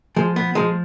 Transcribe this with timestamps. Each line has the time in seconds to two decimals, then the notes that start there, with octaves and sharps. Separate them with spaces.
0.16 F3 G#3
0.36 B3
0.55 F3 G#3